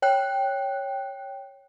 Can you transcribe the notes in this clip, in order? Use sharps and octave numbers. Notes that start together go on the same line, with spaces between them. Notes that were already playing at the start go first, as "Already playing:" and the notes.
C#5 G5 F#6